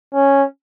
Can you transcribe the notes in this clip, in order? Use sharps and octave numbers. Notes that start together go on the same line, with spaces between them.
C#4